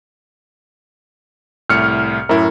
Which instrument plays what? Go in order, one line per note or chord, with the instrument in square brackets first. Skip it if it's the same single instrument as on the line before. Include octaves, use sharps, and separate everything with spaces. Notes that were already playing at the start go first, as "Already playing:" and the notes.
[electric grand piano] C2 A2 C#7 [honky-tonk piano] F6
[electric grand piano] F#2 A2 E4 [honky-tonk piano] A#4